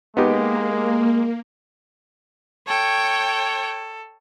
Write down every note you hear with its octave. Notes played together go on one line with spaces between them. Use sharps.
G#3 A#3 B3 D#4 G4
A4 C#5 G5